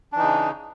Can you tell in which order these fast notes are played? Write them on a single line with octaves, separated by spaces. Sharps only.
D4 E3 D#4 C#3